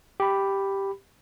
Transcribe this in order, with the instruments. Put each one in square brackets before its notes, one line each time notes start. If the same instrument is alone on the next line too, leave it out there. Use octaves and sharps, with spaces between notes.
[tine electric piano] G4 B5